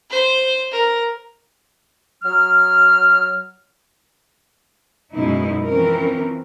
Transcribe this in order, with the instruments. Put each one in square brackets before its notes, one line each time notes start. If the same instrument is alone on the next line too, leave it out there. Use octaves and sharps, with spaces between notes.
[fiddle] C5
A#4
[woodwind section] F#3 F6
[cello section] F#2 B2 G#3 D#4 E4
E3 F3 C4 C#4 A#4